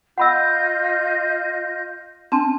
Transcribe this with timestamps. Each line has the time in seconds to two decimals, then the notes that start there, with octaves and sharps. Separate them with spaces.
0.18 F4 D#5 F#5 B5 E6 G6
2.32 C4 D4 A5 C6